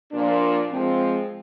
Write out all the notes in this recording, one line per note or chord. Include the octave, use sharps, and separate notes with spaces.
A#2 F3 A#3 D4
F3 G#3 C4